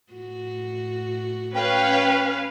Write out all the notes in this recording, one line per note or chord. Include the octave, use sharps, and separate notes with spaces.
A2 F#4
C#4 B4 F5 G5